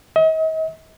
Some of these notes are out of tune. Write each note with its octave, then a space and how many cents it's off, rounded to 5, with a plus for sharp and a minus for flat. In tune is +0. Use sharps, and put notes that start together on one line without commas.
D#5 +40